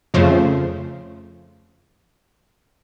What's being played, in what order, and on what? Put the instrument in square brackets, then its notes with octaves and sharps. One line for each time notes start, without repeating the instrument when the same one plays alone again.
[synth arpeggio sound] F2 C#3 F3 A3 C5